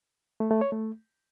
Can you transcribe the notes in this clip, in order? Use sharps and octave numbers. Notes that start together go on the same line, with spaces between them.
A3
A3
C#5
A3